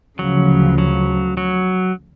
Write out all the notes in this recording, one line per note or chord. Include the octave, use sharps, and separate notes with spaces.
D2 C#3 F3 F#3
F#3
F#3